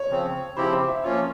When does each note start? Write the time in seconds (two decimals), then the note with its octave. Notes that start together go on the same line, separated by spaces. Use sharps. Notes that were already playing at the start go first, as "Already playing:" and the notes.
Already playing: C#5
0.10 C#3 F3 C4
0.57 C#3 F3 C4 E4 G4 C5
0.72 C5
0.88 E5
1.04 F3 A#3 C#4 F4 C#5